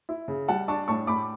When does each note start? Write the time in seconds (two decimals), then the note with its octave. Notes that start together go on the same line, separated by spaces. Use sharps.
0.09 E4
0.28 C#3
0.48 G3 F#5 A5
0.68 D4 A5 C#6
0.88 A2 A5 C#6
1.07 A2 B5 D6